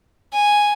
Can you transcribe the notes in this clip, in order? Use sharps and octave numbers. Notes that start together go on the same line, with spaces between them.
G#5